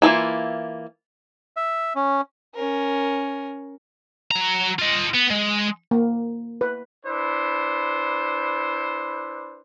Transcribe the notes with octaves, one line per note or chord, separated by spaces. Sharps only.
E3 A#3 E4 F4
E5
C#4
C#4 A#4
F#3 A#5
F4 D#5
B3
G#3
A#3
B4
D4 E4 B4 C5